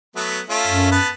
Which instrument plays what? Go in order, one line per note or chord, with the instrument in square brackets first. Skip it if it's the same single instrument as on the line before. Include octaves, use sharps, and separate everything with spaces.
[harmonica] F#3 A3 B3
A3 C#4 F4
[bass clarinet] F#2
[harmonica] B3 B4 A5